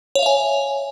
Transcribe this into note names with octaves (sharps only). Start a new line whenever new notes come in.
C#5 E5 F5 G#5